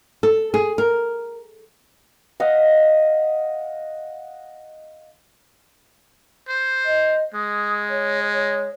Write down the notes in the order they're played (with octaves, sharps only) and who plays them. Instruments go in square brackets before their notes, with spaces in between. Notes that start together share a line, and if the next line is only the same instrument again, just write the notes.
[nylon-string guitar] A4
G#4
A#4
[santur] D#5 F5 F#5
[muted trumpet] C5
[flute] D#5
[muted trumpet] G#3 [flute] D#6
[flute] C#5
C#5